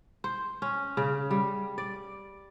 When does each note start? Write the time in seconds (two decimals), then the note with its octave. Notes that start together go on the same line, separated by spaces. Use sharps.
0.24 C5
0.62 C#4
0.97 C#3
1.31 G3
1.78 D5